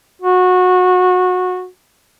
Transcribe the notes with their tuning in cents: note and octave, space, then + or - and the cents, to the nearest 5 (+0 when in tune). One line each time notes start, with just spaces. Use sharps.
F#4 -20